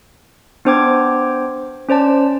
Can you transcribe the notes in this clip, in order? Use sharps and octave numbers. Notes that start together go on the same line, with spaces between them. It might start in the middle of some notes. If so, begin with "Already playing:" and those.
B3 D4 C5 G5 D6 G#6
C#4 C5 D5 A5